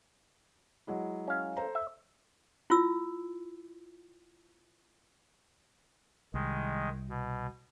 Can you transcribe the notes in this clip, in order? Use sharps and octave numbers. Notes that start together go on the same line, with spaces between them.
F#3 G#3 E4
C#4 F5
A4 C5 A#5
E5
E4 F4 E6
C2 D#3 G#3
B2